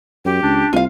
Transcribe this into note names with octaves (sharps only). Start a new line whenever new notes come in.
F#2 G4
C#2 D4
C2 F4 F5